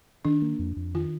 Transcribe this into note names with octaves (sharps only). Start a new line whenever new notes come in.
D#3 D4
A#3
F2
F2
D#3 F4